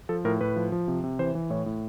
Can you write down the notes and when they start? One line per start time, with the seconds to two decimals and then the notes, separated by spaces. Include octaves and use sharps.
0.09 F3 A4
0.25 A2 A#4
0.41 A2 B4
0.56 F3
0.72 F3
0.88 C3
1.04 C3
1.19 E3 C5
1.35 E3
1.50 A2 C#5
1.66 A2